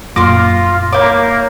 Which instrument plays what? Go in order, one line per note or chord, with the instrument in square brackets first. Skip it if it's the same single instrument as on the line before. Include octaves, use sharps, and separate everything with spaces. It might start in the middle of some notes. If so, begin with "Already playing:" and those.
[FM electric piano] F#2 A#2 A#6 [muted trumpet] F4 [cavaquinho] C6 D6
[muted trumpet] A#3 [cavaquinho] E4 D6 [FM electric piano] C#5 G6